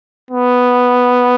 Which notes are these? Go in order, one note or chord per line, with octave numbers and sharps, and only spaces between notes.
B3